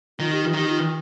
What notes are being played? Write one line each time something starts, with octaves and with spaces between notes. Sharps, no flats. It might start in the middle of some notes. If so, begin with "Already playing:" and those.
D#3 F4
G4
F4
D#3 G4
F4